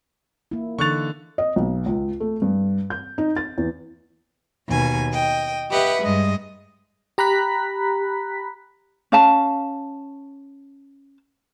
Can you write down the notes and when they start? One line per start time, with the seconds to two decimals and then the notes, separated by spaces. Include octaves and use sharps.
0.51 A#3 E4
0.79 D3 E3 D#4 C#6 F#6 A6 F7
1.38 D#5
1.56 B1
1.86 C#2
2.20 A3
2.42 G2
2.90 G6
3.18 D#4
3.36 A6
3.58 E2
4.66 D#2 B2 G#5
5.11 D#5 G5
5.69 G4 B4 D#5 E5 F#5
6.01 G2 G#3 D#5
7.18 G4 A#5 B5 F#6 B6
9.12 C#4 F5 A5